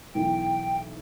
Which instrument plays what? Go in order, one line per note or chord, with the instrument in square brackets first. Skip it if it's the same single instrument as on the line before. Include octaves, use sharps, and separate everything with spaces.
[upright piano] B1 E3 [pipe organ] G5